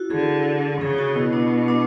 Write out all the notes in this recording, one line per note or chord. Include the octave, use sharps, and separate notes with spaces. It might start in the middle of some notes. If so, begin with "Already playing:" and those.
Already playing: E4 F#4
D3 G#4
C#3 G#4
F#4
B2 E4
D4
D4